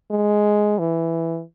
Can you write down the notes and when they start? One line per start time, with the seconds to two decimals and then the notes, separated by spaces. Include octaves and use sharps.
0.11 G#3
0.79 E3